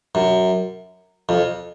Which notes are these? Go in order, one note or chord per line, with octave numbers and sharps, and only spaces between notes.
F#2
F2